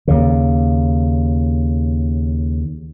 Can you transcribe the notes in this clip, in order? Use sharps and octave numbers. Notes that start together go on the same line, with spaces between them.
D#2 C#3